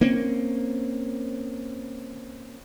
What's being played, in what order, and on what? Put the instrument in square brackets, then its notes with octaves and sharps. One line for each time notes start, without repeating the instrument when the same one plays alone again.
[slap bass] A#3 C4 C#4